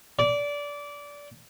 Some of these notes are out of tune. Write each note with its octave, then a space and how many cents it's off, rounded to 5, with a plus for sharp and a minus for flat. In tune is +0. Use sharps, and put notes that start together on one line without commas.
D5 -20